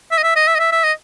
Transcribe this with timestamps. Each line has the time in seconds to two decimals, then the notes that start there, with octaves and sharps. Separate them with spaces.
0.11 E5
0.18 D#5
0.23 E5
0.36 D#5
0.47 E5
0.55 D#5
0.59 E5
0.72 E5
0.84 D#5